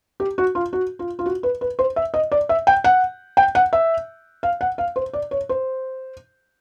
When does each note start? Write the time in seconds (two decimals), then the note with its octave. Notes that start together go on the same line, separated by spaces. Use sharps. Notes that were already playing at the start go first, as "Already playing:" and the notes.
0.20 G4
0.38 F#4
0.55 F4
0.73 F#4
0.99 F4
1.19 F4
1.26 F#4
1.43 B4
1.61 B4
1.79 C5
1.96 E5
2.14 D#5
2.32 D5
2.49 E5
2.67 G5
2.84 F#5
3.37 G5
3.55 F#5
3.73 E5
4.43 F5
4.61 F#5
4.78 F5
4.96 C5
5.13 D5
5.31 C#5
5.49 C5